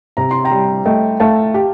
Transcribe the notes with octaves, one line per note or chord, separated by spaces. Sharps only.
C3 A#5
C6
G5 A#5
G3
A3 D#5 G5
A3 F5 A5
G4